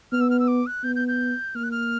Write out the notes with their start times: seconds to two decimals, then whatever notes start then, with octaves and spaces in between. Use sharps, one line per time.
0.12 B3 F6
0.21 E6
0.30 F6
0.40 E6
0.48 D6
0.67 F#6
0.84 B3 G6
0.96 G6
1.08 G6
1.55 A#3 F6
1.64 F#6
1.72 F6